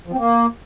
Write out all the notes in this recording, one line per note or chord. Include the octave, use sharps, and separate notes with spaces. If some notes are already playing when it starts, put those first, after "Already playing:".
F3
C4
A#3